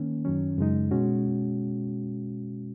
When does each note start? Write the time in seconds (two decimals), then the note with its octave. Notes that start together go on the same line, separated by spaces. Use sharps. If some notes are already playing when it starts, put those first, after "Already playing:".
Already playing: D#3 A#3 C#4
0.25 F#2 D#3 F#3 C#4
0.58 F#2 C#3 G#3 D#4
0.91 B2 G#3 C#4 F#4